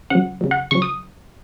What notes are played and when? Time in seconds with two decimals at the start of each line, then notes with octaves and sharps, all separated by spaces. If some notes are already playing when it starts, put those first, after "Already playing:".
0.10 C#3 F#3 F#5
0.41 C#3 F#3
0.51 F#5
0.71 C#3 F#3 C#6
0.82 D#6